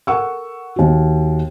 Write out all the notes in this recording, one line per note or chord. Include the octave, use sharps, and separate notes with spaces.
A4 A#4 F#5 C#6 E6
D#2 F#4